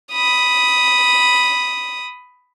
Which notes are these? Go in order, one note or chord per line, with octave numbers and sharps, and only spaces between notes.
B5 D#6